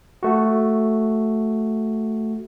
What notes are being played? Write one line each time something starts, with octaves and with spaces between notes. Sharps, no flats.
A3 F#4